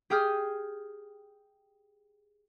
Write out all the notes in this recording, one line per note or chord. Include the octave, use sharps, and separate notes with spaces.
G4 G#4 G5 D#6 F6 G6